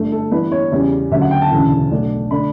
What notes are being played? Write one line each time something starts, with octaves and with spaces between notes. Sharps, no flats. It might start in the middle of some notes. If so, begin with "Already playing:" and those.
Already playing: G1 G2 D3 A3
A4
G2 E3 B3 D4 B4
C#5
E2 C#3 G3
D2 C#3 F#3 E5
F#5
G5
A5
E1 D2 C#3 E3
B1 B2 A3 D4
D3 A3 D4 B5